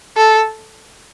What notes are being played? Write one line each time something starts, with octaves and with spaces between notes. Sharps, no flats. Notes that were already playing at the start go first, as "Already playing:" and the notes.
A4